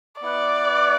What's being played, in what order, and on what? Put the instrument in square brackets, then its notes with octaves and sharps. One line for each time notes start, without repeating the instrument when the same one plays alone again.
[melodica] B3 E4 B4 [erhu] D5